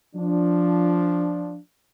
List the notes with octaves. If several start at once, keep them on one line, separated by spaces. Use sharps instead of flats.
F3 D4